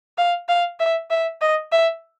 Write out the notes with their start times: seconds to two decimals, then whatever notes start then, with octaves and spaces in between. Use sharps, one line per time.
0.18 F5
0.49 F5
0.80 E5
1.10 E5
1.42 D#5
1.72 E5